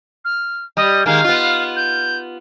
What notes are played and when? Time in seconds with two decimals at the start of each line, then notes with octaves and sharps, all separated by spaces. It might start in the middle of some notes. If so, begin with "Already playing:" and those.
0.25 F6
0.77 G3 D#5
1.06 D#3 G#3 A#3 F5
1.24 B3 F4
1.76 G6